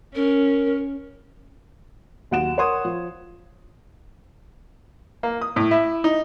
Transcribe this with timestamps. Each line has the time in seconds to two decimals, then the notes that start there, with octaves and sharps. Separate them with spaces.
0.15 C#4 A#4
2.31 D#2 F#3 F#5 D7 E7
2.57 A#4 C#5 F#5 C6 D#6 G#6
2.85 F3
5.23 A#3
5.41 D#6
5.56 A2
5.71 E4
6.04 D#4